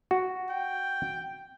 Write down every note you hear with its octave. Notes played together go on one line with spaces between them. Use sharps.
F#4
G5